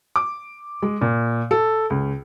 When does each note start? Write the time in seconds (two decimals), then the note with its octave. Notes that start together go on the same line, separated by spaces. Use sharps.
0.16 D6
0.82 G#3
1.01 A#2
1.51 A4
1.90 C#2